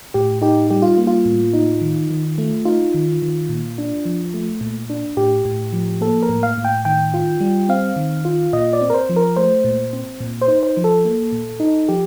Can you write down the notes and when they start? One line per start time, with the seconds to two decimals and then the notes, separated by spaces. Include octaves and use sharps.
0.14 A2 G4
0.42 D#4 G4
0.70 G3 G4
0.82 F4
0.98 A#3
1.07 F4
1.25 A2
1.53 D#4
1.82 D#3
2.11 D#3
2.38 A3
2.65 D#4 F4
2.94 D#3
3.22 D#3
3.49 A#2
3.78 D4
4.05 F3
4.34 A3
4.61 A#2
4.90 D4
5.17 A2 G4
5.45 A2
5.73 F3
6.01 A#3 A4
6.23 A#4
6.29 A2
6.43 F5
6.58 A2
6.65 G5
6.85 D#3 G5
7.14 F4
7.40 G3
7.69 C4 F5
7.96 D#3
8.25 F4
8.53 A#2 D#5
8.73 D5
8.81 C4
8.90 A#4
8.94 C5
9.09 F3
9.16 A#4
9.36 A3 C5
9.65 A#2
9.93 C4
10.20 A#2
10.41 C5
10.48 D#4
10.63 C5
10.77 F3
10.84 A4
11.05 A#3
11.32 A#2
11.60 D#4
11.89 F3 G4